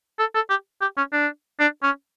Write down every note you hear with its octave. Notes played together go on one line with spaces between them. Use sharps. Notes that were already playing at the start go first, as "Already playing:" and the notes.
A4
A4
G4
G4
C#4
D4
D4
C#4